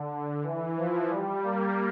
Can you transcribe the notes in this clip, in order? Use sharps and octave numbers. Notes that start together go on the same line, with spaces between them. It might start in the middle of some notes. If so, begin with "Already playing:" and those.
Already playing: D3
E3
F3
G3
A#3